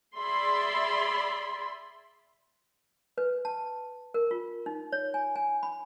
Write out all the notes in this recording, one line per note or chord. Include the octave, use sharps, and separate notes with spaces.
G#4 D5 E5 B5 C6
B4
A5
A#4
F4
D#4
C#5
G#5
G#5
B5